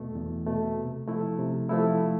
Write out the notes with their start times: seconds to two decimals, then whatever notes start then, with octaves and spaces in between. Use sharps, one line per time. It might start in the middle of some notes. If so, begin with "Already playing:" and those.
Already playing: E2 B2 A3
0.16 E2
0.47 B2 A3
0.78 C3
1.08 F3 A3 E4
1.39 C3
1.69 F3 A3 E4